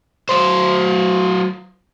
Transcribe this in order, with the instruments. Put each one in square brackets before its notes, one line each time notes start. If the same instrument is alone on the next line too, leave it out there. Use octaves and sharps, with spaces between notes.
[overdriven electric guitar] F#3 C5